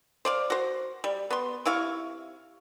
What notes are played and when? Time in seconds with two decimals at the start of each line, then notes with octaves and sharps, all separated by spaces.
0.25 C5 D5 F5
0.50 F#4 C5
1.04 G3
1.30 B3 C6
1.65 C3 E4 F5 C#6